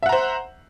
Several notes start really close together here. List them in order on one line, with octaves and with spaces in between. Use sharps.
E5 F#5 A#5 C5